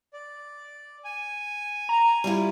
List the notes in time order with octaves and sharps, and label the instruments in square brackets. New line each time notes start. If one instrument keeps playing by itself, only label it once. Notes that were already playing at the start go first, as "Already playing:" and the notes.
[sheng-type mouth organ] D5
G#5
[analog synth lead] A#5
[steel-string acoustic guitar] G3 E4 F4